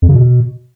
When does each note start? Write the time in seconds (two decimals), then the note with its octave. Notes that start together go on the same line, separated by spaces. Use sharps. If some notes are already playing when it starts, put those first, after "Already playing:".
0.02 F2
0.09 C#3
0.15 B2